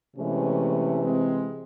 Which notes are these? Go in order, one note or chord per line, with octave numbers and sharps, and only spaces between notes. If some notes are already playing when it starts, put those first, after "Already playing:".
C3 E3 G#3 A3 C#4
G#3 C4